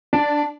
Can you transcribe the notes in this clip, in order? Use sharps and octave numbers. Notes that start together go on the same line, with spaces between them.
D4